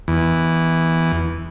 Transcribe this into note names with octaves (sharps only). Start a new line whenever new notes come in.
E2